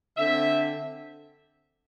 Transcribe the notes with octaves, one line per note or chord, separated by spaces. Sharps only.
D3 C4 E5